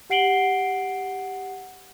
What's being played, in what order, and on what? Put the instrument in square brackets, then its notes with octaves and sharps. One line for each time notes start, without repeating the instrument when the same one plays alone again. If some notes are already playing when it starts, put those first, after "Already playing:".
[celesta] G4 F#5 C7 D7 F#7 G7